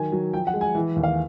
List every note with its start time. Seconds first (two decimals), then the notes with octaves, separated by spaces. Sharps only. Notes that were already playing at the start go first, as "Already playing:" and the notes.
Already playing: D#3 F#3 G#5
0.12 F#3
0.33 F3 G5
0.47 F#5
0.54 G#3
0.61 G#5
0.75 E3
0.96 D#2
1.03 F5